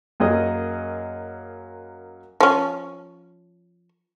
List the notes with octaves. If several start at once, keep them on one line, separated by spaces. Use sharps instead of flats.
F#2 A#3 G#4 C#5 D#5 D#6
F3 C#4